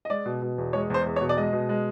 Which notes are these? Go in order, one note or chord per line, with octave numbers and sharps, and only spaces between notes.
D#5
G#3 D5
B2
B2
E2
G#3 C#5
E2 C5
E2
C#5
B2
D5
G#3 D#5
B2
G#3